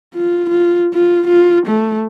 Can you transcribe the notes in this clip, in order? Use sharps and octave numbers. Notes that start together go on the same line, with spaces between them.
F4
F4
F4
F4
A3